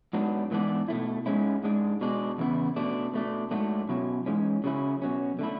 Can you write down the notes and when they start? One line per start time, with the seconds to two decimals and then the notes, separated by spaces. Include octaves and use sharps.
0.13 G#2 F#3 B3 D4
0.51 G#2 E3 B3 D4
0.88 B2 A3 E4
1.26 G#2 G#3 C#4 E4
1.64 G#2 G#3 D4
2.01 B2 G#3 D4
2.38 E2 C#3 B3 E4
2.76 B2 A3 D4
3.14 B2 A3 D4
3.51 G#2 F#3 A3 D4
3.89 B2 F#3 C#4 E4
4.26 G#2 E3 G#3 C#4
4.64 C#3 F#3 C#4 E4
5.02 B2 F#3 C#4
5.39 D3 A3 E4